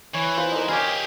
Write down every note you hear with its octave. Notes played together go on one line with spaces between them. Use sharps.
E3 C#5
F4 B4 C5
D#4 A#4
G4 G#4 C#5 D#5 F5 G#5 D6 E6